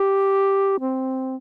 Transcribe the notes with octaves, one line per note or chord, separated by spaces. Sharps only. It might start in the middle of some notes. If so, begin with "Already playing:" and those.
Already playing: G4
C4